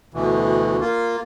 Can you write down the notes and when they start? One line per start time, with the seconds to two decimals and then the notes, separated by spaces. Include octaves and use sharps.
0.14 D2 B2 E3
0.81 A#3 F4